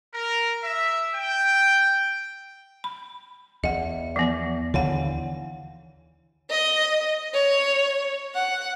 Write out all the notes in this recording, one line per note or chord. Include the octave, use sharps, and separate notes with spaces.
A#4
E5
G5
B5
E2 D#5 F#5
E3 F3 B3
D#2 D3 E3 C#5 F5 F#5
D#5
C#5
F#5